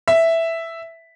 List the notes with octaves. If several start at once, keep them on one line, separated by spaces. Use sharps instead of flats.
E5